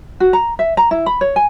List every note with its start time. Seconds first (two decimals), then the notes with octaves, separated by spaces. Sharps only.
0.20 F#4
0.33 A#5
0.59 E5
0.77 A#5
0.91 E4
1.06 B5
1.21 C#5
1.36 G#5